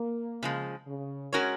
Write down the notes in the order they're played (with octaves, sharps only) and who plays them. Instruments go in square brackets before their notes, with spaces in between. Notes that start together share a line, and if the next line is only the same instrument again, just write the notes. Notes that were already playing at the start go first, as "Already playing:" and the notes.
Already playing: [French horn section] A#3
[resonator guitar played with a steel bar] C#3 F3 G#3
[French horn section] C#3
[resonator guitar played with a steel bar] G#3 C#4 F#4 A#4 C#5